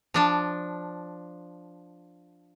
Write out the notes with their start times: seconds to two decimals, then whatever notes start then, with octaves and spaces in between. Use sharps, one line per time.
0.14 F3 D4 A5